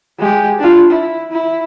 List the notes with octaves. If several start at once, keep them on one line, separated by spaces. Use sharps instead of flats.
G#3 G4
D4 F4
E4
E4